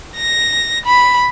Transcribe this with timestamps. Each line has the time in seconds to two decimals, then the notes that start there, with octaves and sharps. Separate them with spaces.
0.16 A#6
0.86 B5